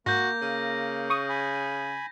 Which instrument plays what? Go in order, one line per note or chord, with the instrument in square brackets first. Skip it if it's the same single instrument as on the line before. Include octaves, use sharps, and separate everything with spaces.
[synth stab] G#2 [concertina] A#3 [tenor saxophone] F#4 [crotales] G6 A#6
[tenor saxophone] C#3
[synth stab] C#6 D#6
[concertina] G#5 B5